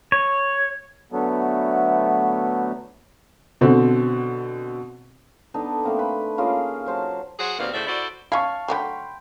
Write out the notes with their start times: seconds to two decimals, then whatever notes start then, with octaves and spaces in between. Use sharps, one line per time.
0.12 C#5
1.12 D3 F#3 A3 B3
3.61 B2 D3 C4
5.54 B3 D4 D#4 A4
5.84 A3 A#3 C4
5.99 B4 B5
6.38 A#3 C#4 F4 G#4
6.86 F#3 C5 A5
7.39 F#3 G#4 C5 F#5
7.59 D#2 B2 G3 A#3 C4 F5
7.73 A2 C#3 F#4 C5 D5 E5
7.87 E4 F#4 A4 C5 D5
8.32 C#4 E4 F5 A5 C#6 G#6
8.68 D3 F#3 A3 G5 B5 C6